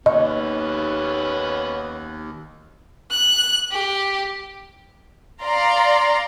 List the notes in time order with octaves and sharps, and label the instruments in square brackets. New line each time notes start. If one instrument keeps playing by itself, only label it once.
[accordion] D#2 [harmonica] B3 C#4 [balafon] D#5
[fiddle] F#6
G4
[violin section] D5 F5 A#5 C6